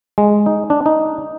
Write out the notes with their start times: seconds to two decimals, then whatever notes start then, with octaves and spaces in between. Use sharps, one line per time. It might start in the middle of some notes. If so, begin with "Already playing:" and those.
0.18 G#3
0.46 D#4
0.70 D4
0.86 D#4